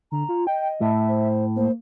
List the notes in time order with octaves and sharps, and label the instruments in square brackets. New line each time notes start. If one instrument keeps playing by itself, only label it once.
[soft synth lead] D3 [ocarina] A#5
[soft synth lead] F4
[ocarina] D#5 [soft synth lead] G5
[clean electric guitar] A2 [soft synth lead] E5
[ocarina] C5
[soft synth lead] A#3 [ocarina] C5